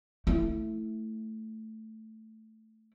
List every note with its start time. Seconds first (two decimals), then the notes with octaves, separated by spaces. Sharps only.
0.27 A3 E4